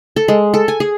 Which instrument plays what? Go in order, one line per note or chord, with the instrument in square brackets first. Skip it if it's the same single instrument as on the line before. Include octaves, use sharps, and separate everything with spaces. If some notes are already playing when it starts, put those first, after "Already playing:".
[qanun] A4
G#3
A4
G#5
G#4